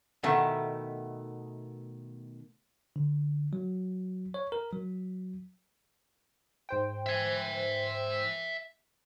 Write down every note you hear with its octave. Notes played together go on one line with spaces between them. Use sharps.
B2 D#3 A3 B3 E4
D3
F#3
C#5
A#4
F#3
G#2 C5 G5
E5 G#5